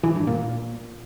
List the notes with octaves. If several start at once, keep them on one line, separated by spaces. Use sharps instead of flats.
E3
G2
A#2